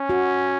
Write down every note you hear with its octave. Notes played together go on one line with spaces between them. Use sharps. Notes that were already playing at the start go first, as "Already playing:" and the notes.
Already playing: C#4
F#4